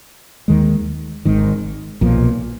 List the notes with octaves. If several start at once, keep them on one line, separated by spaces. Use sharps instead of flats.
D#2 D#3 G#3
G#1 G#2 D#3
B1 A#2 F3